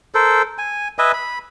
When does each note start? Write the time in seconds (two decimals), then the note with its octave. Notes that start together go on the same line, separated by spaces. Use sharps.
0.15 A4 A#4 C5
0.58 G#5
0.99 B4 D#5 E5 G#5
1.13 B5